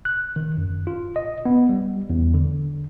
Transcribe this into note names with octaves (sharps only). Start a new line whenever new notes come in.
F#6
D#3
F#2
F4
D#5
B3
G3
E2
D3